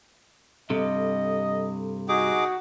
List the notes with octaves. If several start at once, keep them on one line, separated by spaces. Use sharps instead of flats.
G2 C3 A4 D#5
D#4 F#4 G#4 D6